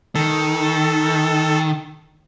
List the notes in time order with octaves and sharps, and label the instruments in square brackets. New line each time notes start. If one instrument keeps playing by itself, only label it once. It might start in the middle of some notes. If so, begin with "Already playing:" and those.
[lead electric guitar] D#3 [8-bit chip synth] A4